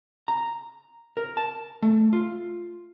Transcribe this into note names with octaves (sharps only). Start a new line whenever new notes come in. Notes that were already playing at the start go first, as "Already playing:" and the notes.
A#5
A#4
A5
A3
F4